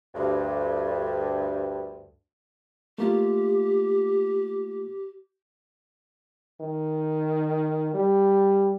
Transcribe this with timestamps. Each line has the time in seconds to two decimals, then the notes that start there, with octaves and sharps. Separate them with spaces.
0.15 D2 G2
2.98 A3 A#3 F4 G4
6.60 D#3
7.94 G3